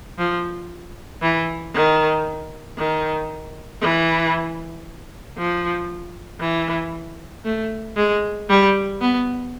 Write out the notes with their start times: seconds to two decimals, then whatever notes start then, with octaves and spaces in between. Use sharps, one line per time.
0.18 F3
1.22 E3
1.74 D#3
2.78 D#3
3.82 E3
5.38 F3
6.41 E3
7.45 A3
7.96 G#3
8.49 G3
9.01 B3